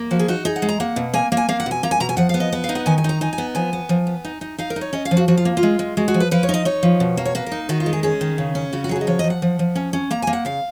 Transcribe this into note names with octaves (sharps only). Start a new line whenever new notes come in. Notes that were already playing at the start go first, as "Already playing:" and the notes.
Already playing: A#3
F3 F#4
G#4
D#4 F#4
D#4 G#4
F#5
G#3
A#5
A#3 F#5
B2
A#3 G#5
A#3
G#5
A#3 F5
F#5
B2 G#5
A#3 A#5
G#5
B2 A#5
G#5
F3 F#5
B3 F5
D#5
B3
F5
D#4
F#5
D#3 G#5
G#5
D#4 A#5
D#4 G#5
G#5
B3
F3 G#5
B3
F3
B3
D#4
D#4
D#4 F5
A#4
D#4
C#5
C#4 D#5
F5
F3
F#4
F3 F#4
F4
A#3
F4
G#3
G#3
G#3 F#4
F#4
F3
B4
F3 B4
C#5
D#4 D#5
D#4 C#5
F3
B2
A#3
C#5
A#3 B4
A#4
D#4
D#3 F#4
F4
G#3
G#4
C#4 G#4
D#3
C#3
C#4
C#3 F#4
F#4
F#3 G#4
F#4
D#5
F3 C#5
F3 D#5
F#5
F3
F3
C#4
C#4
A#3 A#5
A#3 G#5
F#5
C#3 F5